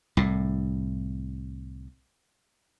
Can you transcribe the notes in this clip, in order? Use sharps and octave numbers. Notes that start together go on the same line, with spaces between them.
C2 A2